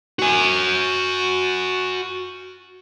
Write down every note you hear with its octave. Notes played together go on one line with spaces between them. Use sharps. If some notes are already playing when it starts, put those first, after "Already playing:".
F#4 G#5